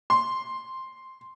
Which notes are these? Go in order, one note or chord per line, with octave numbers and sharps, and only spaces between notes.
C6